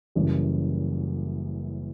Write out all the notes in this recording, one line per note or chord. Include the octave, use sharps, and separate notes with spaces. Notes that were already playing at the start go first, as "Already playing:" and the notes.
F#1 F#2 E3 G3